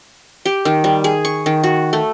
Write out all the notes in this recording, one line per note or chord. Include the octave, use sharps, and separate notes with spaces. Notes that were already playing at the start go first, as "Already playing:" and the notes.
G4
D#3
G3
G#4
C#6
D#3
F#4
A3